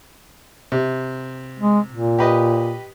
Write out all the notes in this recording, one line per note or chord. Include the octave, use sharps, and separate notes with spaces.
C3
G#3
A#2
G4 B4 D#5